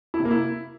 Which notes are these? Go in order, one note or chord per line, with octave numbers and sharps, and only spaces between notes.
E4
C3
A#3
E4